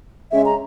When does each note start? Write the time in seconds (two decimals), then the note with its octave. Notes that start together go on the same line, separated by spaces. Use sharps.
0.31 C#3 G#3 C#4 E5
0.45 A#5